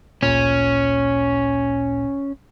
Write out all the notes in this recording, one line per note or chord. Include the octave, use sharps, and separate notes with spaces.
A1 D2 A#2 C#4